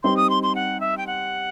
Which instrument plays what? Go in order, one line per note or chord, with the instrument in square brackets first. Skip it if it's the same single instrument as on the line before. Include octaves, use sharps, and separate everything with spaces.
[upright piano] G3 C4 D#4 [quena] C6
[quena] D#6
C6
C6
F#5
E5
G5
F#5